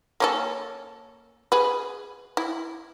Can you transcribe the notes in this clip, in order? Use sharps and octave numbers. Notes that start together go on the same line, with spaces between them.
A#3 C#4 A4
G#4 B4
E4